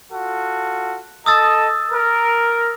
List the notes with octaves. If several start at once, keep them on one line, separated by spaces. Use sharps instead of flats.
F4 F#4 A4
A4 D#5 A5 D#6 E6 A6
A#4